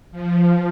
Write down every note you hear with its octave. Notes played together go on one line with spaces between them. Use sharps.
F3